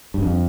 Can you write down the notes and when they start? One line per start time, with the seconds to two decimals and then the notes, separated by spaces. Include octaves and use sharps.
0.14 G2
0.23 F2